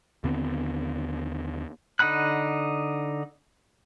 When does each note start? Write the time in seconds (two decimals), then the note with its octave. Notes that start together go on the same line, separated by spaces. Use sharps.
0.24 D#2 D3 B3 C4
1.99 D3 D#4 F#5 B5 F#6